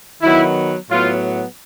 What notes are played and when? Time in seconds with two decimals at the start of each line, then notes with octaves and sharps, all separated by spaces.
0.22 D#3 F#3 B3 E4
0.90 A2 F#3 B3 F4